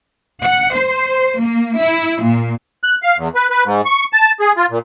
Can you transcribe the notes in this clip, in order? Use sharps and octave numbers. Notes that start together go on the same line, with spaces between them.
F#5
C5
A#3
E4
A#2
F#6
F5
E2
B4
B4
G#2
C#6
A5
G#4
F4
A#2